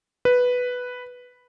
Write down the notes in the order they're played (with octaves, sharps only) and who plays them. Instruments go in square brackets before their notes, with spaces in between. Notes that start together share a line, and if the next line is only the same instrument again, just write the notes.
[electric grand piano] B4